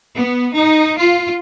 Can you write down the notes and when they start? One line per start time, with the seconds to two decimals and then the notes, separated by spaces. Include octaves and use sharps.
0.17 B3
0.56 D#4
0.99 F4